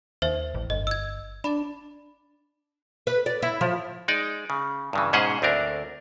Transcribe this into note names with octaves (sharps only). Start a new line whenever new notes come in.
D#2 C5 E5
A1
G1 D#5
E6 G#6
D4 B5
B4
D5
E4
F3
G#3 D#4 D5
C#3
G2 C#3 E3
G#2 B2 C#4 G#4 C5 F#5
D2 C4 D4 A#4